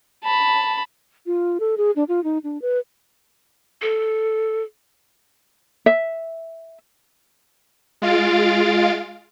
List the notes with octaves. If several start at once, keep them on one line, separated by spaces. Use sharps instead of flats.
A5 B5
F4
A4
G#4
D4
F4
D#4
D4
B4
A4
E5
G#3 F4 F5 A6 D7